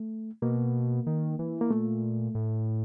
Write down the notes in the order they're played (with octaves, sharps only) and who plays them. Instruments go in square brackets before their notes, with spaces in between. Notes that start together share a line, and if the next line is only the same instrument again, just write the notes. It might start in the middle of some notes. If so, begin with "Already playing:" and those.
Already playing: [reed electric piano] A3
[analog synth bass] B2 [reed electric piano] A#3
[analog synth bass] D#3
E3
[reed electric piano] A#3
[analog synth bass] A#2 [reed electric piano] A3
[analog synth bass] A2